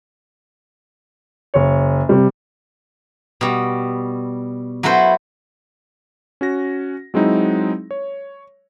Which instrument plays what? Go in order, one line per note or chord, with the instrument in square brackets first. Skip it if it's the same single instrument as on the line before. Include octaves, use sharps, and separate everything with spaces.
[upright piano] F#1 C#5
C3 G3
[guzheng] B2 G3
F#3 E4 A4 B4 C5
[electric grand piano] C#4 F#4 A#6
F#3 G#3 C4 D#4 E4
C#5